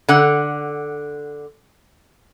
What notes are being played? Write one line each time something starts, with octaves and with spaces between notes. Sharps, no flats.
D3 F#5